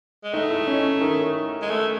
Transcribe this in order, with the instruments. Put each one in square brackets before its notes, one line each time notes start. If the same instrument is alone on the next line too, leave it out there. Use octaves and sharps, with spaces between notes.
[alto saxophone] G#3
[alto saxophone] A3 [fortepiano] D#4
[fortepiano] E4
C#4
D#3
[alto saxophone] G#3
A3